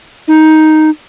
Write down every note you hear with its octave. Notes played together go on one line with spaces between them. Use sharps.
D#4